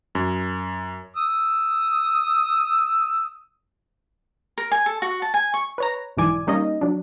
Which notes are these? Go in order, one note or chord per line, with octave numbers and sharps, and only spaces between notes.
F#2
D#6 E6
A#4
G#5
A4
F#4
A5
G#5
C#6
B4 C#5 A#5
B1 G#2 E3 D5 G#5
G3 A#3 C#4 D#4 D#5
F#3 D4